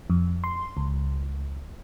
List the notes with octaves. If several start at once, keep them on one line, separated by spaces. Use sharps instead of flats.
F2
C6
C#2